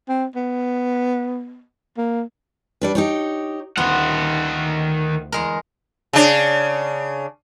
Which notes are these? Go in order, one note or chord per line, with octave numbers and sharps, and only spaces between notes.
C4
B3
A#3
G3 D4 B4
D#4 G4 C#5
D2 D#3 B3 F4 F#5
E2 G#3 A#4
C#3 D4